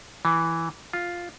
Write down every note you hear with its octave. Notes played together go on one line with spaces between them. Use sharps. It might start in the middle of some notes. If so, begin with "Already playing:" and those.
E3
F4